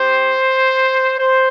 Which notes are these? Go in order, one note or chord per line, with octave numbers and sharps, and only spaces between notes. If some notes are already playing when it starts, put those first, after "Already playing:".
Already playing: C4 G4 C5
C5